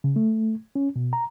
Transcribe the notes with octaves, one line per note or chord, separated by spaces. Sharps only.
C#3
A3
C#4
B2
A#5